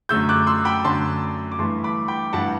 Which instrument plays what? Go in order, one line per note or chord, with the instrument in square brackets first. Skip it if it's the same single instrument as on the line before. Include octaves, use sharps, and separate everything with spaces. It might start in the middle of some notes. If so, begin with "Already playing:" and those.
[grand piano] F#2 D3 A3 E6 G6
D6 F#6
C6 E6
G5 B5
F#2 D3 A3 A5 C6
D6
G2 E3 A3 A5 C6
B5 D6
G5 B5
G2 E3 A3 F#5 A5